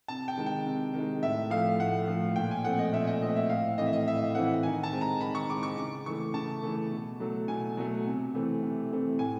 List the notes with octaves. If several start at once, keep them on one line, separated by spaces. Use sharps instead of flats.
C3 A5
G5
D#3 G#3
G5
C3
D#3 G#3
A2 E5
F3 A3 F5
A2 F#5
F3 A3
A#2 G5
G#5
F3 A3 C4 F#5
D#5
A#2 E5
D#5
F3 A3 C4 D#5
E5
A2 F5
E3 A3 C4 D#5
E5
D#5
A2 E5
E3 A3 C4 F#5
D#3 G#5
A5
G#3 C4
A#5
D#3 B5
C#6
G#3 C4 D6
C#6
C#3 D6
E3 A3 C#6
C#3 A5
E3 A3
B2
F#3 A3
B2 G#5
F#3 A3
C3
E3 A3 C4
C3
E3 A3 C4
A2 G#5